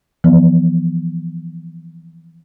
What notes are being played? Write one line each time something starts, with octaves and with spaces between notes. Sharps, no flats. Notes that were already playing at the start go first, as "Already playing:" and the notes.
E3 F3 B3